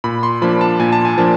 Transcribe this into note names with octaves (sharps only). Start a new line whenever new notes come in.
A#2 B5
C6
F3 A#3 D4 B5
A5
A#2 G#5
A5
G#5
F3 A#3 D4 A5